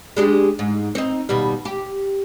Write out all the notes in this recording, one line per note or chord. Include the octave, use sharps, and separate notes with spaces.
G#3 D4 G4
G#2
C4 D#4
D#2 B2 G3
G4